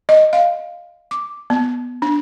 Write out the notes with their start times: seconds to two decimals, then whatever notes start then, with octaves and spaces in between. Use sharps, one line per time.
0.09 D#5
0.33 F5
1.11 D6
1.50 B3
2.02 D4